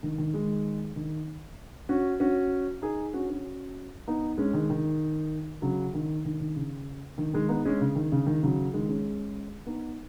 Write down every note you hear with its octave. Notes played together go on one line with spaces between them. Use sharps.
D#3
D#3
D#3 G#3
D#3
C#4 F#4
C#4 F#4
D#4 G#4
C#4 F#4
C#4 F#4
B3 D#4
G#3 C#4
D#3 G#3
D#3
C#3 F#3
D#3
D#3
D#3
C#3
D#3
D#3 G#3
B3 D#4
G#3 C#4
C#3
D#3
C#3
D#3
C#3 F#3
D#3 G#3
G#3 C#4
B3 D#4